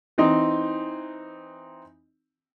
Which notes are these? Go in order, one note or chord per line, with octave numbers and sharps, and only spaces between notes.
E3 C4 D#4